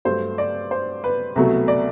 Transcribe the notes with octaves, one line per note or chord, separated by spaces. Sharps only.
G2 F#3 A3 C5
D5
C5
B4
C2 B2 F#3 A3
D5